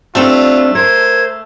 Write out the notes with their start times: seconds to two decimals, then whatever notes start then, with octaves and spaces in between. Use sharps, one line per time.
0.15 G3 A3 C4 D4 F4 A4
0.75 A#4 C5 G#6